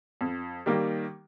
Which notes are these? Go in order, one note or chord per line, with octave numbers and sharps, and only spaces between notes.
F2
D#3 G3 A#3